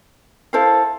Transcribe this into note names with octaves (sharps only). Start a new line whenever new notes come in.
E4 A4 C5 F5